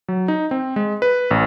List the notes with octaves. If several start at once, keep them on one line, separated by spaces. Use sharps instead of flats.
F#3
D#4
C4
G#3
B4
A1